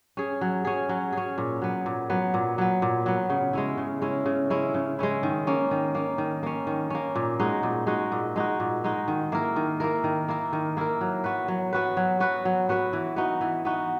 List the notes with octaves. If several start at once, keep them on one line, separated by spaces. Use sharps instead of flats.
C#4 G#4
F#3
C#4 G#4
F#3
C#4 G#4
A#2
F#3 B3
A#2
F#3 B3
A#2
F#3 B3
A#2
F#3 B3
C#3
G#3 C#4 E4
C#3
G#3 C#4 E4
C#3
G#3 C#4 E4
C#3
G#3 C#4 E4
D#3
A#3 C#4
D#3
A#3 C#4
D#3
A#3 C#4
D#3
A#3 C#4
A#2
G#3 D#4 F#4
A#2
G#3 D#4 F#4
A#2
G#3 D#4 F#4
A#2
G#3 D#4 F#4
D#3
A#3 E4 A#4
D#3
A#3 E4 A#4
D#3
A#3 E4 A#4
D#3
A#3 E4 A#4
F#3
B3 F#4 B4
F#3
B3 F#4 B4
F#3
B3 F#4 B4
F#3
B3 F#4 B4
E3
B3 D#4 F#4
E3
B3 D#4 F#4